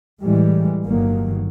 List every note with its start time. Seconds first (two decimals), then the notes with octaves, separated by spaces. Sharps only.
0.24 A2 E3 G3 G#3
0.85 G1 D#3 F#3 A#3